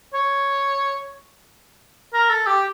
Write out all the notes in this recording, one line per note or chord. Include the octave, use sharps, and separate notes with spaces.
C#5
A#4
A4
G4